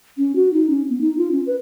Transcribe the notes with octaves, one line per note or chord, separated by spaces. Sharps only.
C#4
F#4
D#4
C#4
B3
D#4
F4
C#4
B4